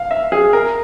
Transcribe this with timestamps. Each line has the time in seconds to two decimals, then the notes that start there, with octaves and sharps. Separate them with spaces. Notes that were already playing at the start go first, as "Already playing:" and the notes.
Already playing: F5
0.11 E5
0.32 G#4
0.53 A#4